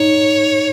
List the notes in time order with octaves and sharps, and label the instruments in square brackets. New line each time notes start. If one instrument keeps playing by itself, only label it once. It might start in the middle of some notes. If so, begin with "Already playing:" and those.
Already playing: [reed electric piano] D#4 [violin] C#5